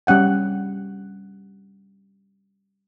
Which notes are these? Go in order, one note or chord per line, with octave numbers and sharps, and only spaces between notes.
G3 C#4 F#5 G5